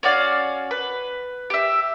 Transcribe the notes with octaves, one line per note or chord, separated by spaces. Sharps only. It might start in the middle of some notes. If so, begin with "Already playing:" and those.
C#4 F#4 D5 F5
B4
G4 E5